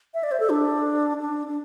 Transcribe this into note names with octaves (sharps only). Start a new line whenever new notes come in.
E5
D5
C5
A4
D4
D4
D4